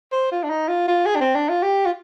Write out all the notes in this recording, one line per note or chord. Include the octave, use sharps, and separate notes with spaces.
C5
F4
D4
D#4
F4
F4
G#4
D4
C4
D4
F4
G4
F4